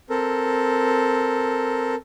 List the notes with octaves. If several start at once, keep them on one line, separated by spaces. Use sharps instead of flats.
C4 A4 A#4